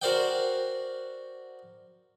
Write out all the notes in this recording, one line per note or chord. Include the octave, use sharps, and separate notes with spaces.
F#4 A#4 C5 D5 F#5 G5